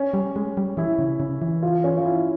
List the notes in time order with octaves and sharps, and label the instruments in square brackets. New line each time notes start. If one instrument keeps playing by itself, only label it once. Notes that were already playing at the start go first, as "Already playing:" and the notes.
Already playing: [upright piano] C#4
[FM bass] G3
G#3
G3
[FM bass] E3 [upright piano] E4
[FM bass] C#3
C#3
E3
[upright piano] F4
C#4
F4
E4